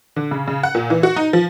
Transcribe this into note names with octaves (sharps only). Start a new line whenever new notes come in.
D3
C#3
C#3
F#5
A#2
E3
F#4
D#4
F3